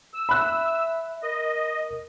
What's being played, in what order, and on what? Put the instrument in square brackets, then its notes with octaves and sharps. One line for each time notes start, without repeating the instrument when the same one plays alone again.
[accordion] E6
[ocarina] E5 [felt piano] B5 F#6
[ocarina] A#4 [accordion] D#5